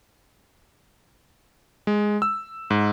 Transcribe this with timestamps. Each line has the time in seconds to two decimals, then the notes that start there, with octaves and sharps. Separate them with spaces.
1.87 G#3
2.22 E6
2.70 G#2